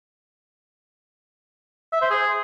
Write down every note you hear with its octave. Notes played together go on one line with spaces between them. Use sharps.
E5
C5
G#4